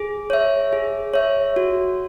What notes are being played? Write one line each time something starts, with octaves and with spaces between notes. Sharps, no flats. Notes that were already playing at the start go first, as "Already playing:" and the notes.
Already playing: G#4
C#5 E5
G#4
C#5 E5
F#4